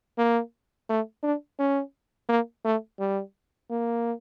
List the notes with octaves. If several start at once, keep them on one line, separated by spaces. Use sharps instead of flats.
A#3
A3
D4
C#4
A#3
A3
G3
A#3